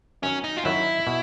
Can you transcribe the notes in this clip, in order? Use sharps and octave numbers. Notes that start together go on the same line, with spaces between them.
F#2 D#3 F#3 C#4
D#4
F4
F#2 D#3 F#3 E4
B2